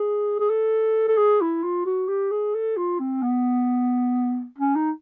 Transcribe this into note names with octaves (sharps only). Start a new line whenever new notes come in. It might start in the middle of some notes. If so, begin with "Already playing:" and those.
Already playing: G#4
G#4
A4
A4
G#4
E4
F4
F#4
G4
G#4
A4
F4
C4
B3
C#4
D#4